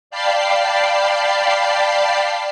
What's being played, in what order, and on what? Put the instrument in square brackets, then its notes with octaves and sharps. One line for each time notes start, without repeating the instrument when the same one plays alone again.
[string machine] D5 F5 G5 A5 B5 C7